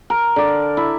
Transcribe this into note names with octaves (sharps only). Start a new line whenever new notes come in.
A#4
D3 D5
E4